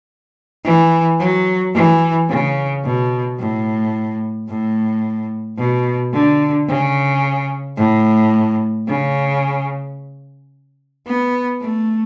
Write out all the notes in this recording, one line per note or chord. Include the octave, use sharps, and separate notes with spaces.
E3
F#3
E3
C#3
B2
A2
A2
B2
D3
C#3
A2
C#3
B3
A3